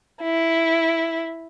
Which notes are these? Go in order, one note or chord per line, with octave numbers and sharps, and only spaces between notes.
E4